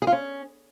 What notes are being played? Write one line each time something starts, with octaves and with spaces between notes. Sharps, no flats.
G#4
F4
C#4